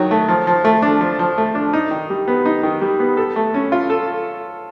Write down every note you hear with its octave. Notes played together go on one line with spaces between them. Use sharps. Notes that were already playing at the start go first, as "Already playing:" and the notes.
Already playing: D#3 F#3
A3
F3
F3
A3
D4
F3
F3
A3
D4
D#4
D#3
G3
B3
D#4
D#3
G3
B3
A4
A3
C#4
F4
A4